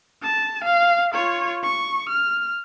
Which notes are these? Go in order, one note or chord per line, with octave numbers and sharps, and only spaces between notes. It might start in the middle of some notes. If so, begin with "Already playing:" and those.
A5
F5
F4 C#5
C#6
F6